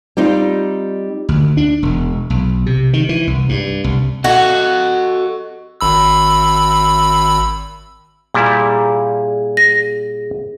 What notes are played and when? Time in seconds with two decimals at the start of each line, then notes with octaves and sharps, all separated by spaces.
0.17 G3 C4 D#4 F4
1.29 D2
1.57 D4
1.82 E1
2.30 B1
2.66 C3
2.93 D#3
3.09 E3
3.27 C2
3.49 G2
3.84 C2
4.24 F#4 A4 D#5
5.81 G#1 B5 E6
8.34 A#2 G3 E4 G#4
9.57 A#6